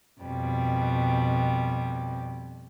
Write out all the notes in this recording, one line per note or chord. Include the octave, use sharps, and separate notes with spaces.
F2 B2 G3